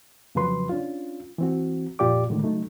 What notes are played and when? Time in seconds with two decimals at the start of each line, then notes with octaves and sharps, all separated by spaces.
0.35 F2 C#3 F3 F#3 B4 C6
0.69 C#4 D4 F4
1.38 E3 C4 F#4
1.99 F2 A#2 F4 G4 D5 D6
2.30 A2 D3 D#3 G#3
2.43 C#3 F#3 A3 D#4